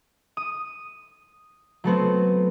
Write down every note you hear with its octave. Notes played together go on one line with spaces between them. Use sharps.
D#6
F#3 A3 B3 C4